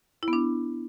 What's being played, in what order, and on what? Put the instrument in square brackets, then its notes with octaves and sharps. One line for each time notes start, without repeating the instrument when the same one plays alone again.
[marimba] E4
B3
D4